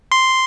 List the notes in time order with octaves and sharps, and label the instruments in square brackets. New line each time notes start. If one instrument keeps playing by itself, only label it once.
[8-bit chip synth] C6